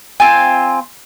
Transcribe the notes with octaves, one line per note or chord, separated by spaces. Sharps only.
C4 F4 G#5